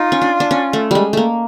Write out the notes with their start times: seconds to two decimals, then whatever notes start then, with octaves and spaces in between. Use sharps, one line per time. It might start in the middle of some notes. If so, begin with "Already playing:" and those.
Already playing: D#4 F4
0.12 C#4
0.22 D4
0.40 D4
0.51 C#4
0.73 A3
0.91 G3 G#3
1.13 A3 A#3